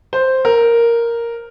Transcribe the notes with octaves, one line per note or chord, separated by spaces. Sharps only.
C5
A#4